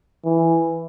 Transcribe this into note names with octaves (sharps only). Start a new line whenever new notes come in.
E3